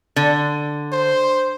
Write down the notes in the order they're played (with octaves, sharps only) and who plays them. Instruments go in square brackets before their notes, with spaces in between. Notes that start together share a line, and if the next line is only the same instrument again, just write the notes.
[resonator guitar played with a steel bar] D3
[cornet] C5